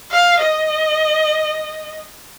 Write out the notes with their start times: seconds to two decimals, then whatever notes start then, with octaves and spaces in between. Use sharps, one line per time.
0.11 F5
0.41 D#5